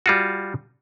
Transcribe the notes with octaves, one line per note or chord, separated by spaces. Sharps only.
G3 F4 F#4